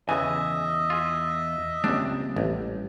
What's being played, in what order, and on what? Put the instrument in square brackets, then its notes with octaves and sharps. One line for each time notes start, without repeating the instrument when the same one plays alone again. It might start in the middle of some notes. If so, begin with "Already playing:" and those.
[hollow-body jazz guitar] E2 G#5 [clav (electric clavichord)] C#3 E3 [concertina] D#5 E5
[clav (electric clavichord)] F4 G#4
[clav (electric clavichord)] C#2 D4 [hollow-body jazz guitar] G3 A#3 C4
[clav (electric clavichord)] A1 [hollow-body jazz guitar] G3